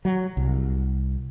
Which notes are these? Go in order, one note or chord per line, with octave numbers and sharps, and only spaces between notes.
F#3
C2